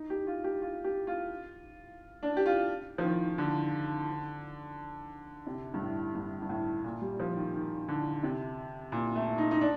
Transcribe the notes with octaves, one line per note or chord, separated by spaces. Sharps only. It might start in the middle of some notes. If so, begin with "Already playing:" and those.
Already playing: D#4
G4
F4
G4
F4
G4
F4
D4
G4
F4
F3
D#3
D3
C3
G2
A2
G2
G2
A2
A#2
G3
F3
D#3
D#3
D3
C3
A#2
A3
D#4
D#4
D4